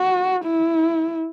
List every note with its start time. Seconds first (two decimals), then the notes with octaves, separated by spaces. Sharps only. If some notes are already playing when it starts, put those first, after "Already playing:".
Already playing: F#4
0.45 E4